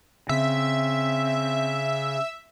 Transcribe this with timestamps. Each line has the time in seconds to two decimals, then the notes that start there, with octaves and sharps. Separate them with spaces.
0.29 C#3 C4 E5